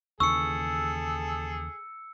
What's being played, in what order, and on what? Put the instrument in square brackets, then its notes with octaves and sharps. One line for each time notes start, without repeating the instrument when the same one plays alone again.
[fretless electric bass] D#2 C#3 E3 [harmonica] G#4 A4 [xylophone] C#6 [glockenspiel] E6 C#7